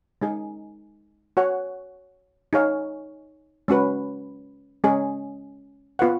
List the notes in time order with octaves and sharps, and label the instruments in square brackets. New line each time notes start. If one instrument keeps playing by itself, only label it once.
[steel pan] G#3 D#4 G#4
F#4 C#5 F#5
D#4 G#4 C#5 F5
G#3 C#4 F#4 B4
G#3 C#4 G#4 D#5
B3 F4 B4 F#5